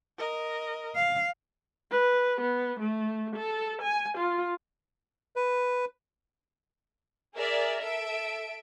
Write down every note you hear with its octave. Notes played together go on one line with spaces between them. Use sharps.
A#4 D#5
F5
B4
B3
A3
A4
G#5
F4
B4
G#4 A#4 D5 E5
A4 E5 D7